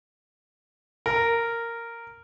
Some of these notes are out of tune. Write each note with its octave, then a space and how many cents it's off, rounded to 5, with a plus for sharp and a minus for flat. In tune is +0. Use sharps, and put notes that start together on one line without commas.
A#4 -10